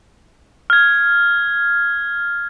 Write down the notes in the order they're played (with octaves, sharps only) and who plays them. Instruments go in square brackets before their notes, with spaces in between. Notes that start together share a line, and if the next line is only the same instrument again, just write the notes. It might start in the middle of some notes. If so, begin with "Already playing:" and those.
[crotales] F6 G#6